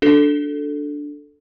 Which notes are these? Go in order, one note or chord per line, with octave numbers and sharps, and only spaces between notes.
D4 F#4 A4